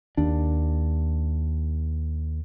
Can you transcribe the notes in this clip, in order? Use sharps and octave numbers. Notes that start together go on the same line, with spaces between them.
D#2 D4